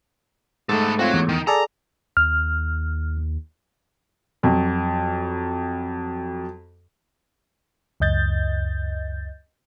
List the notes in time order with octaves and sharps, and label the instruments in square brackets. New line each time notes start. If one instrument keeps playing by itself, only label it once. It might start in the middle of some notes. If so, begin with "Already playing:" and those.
[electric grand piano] G#2 A3 [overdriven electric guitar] B3 A4
[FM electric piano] C4 F4 [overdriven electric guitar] F#4 C#5
[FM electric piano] E2
[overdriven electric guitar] D#3
[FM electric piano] G#4 A4 D5 [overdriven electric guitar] A#5
[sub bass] D#2 [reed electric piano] F6
[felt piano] F2 F#3
[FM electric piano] C#2 F#2 D#5 G6 A6